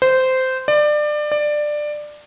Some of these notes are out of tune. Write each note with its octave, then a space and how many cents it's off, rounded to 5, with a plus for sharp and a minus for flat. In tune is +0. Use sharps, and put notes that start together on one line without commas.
C5 -15
D5 +25
D5 +15